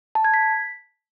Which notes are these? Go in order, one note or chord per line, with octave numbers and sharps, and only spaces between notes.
A5
G#6
B6